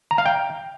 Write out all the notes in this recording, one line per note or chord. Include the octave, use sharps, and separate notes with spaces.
A#5
F5
G5